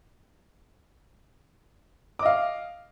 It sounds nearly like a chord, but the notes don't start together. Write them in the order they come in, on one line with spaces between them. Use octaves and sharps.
D6 D#5 F5